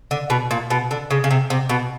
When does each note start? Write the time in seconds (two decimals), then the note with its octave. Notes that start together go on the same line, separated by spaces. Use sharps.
0.11 D3
0.30 B2
0.51 A#2
0.70 B2
0.91 D3
1.11 C#3
1.24 C#3
1.31 C3
1.50 C3
1.70 B2